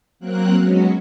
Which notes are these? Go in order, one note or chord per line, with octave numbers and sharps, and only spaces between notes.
F#3 A#3 C4 A#4 F#6
F#3 G#3 B3 C#4 F#4